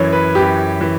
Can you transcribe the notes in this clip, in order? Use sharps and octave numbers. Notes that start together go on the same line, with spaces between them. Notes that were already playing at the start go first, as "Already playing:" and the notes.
Already playing: F#2 E3 C#5
B4
F#2 E3 G4
E3